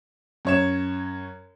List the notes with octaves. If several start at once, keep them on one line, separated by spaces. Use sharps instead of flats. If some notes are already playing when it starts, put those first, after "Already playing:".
F#2 C#5 E7